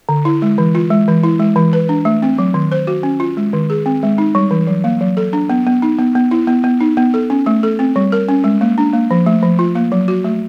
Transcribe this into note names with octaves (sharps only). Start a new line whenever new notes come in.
D3
E4
G#3
E3
F4
G#3
E3
E4
G#3
E3
B4
D4
A3
C4
F#3
D#3
C5
F#4
C#4
F4
G#3
D#3
G#4
C4
G#3
D#4
G3
E3
F#3
A#3
F#3
A4
D4
B3
B3
D#4
B3
B3
E4
B3
B3
D#4
B3
A4
C#4
A3
A4
C4
G3
A#4
C#4
G#3
A#3
D4
A#3
F3
A3
F3
F4
A#3
F#3
F#4
A3